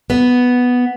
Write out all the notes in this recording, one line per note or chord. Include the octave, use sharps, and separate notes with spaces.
B3